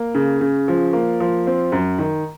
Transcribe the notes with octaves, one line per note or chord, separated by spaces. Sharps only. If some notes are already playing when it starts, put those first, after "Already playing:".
Already playing: A#3
C#3
C#3
F3
A#3
F3
C4
F#2
D#3